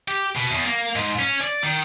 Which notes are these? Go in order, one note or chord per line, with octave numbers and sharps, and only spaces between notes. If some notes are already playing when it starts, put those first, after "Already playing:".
G4
B2
E2
A#3
G#2
C#4
D5
D#3